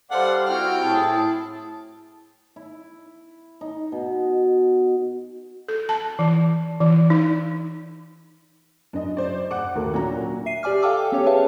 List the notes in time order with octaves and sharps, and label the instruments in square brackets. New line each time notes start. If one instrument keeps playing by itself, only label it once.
[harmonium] G3 F5 [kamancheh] A4 C5 [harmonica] D5 F#5
[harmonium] C4 E4 F#4 [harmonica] G5 [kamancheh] F6
[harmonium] A2 E4 G#4 [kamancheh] A5
[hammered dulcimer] E4
D#4
B2
[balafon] A4
A5
E3
E3
D#4
[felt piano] F#2 [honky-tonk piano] D4 D#5
[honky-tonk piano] C5 D5
F#5 D6
[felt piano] D#2 A3 A#3 [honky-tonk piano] F#4 A4
[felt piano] A#2 D4 A#5 [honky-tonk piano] F#3 C#4 F#4
[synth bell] E5 C7 D#7
G4 D5 G#5 D6 F6
A4 F5 G5 A5 D6 E6
B3 C#4 G4 A4 C#5
G#4 B4 C#5 E5 F5 A5